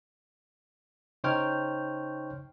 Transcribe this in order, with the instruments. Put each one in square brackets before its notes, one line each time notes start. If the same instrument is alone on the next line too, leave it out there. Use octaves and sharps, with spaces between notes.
[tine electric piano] C#3 D#4 C5 C#5 G5 F6